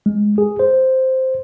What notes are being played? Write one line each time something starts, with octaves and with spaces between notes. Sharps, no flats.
G#3
G#4
C5